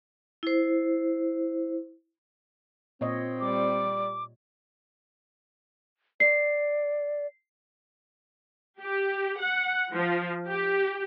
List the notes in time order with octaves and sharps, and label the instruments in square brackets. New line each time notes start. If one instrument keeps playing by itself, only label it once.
[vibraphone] E4 C5
[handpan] A#2 C#5 D#5 [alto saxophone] C4
[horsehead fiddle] G3 D5 [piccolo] D6
[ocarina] D5 [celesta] C7
[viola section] G4
F#5
F3
G4